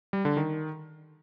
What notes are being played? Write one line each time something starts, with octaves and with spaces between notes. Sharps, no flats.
G3
D3
D#3